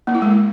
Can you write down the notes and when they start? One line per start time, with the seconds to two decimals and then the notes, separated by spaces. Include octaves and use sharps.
0.07 A#3
0.15 E4
0.22 G#3